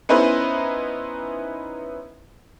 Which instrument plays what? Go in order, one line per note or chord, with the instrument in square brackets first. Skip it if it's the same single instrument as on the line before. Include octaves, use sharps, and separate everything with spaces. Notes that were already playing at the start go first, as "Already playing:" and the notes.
[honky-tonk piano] B3 C#4 D#4 E4 B4 C5